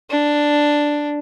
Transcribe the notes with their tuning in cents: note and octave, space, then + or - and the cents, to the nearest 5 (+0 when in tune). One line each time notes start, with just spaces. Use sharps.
D4 +0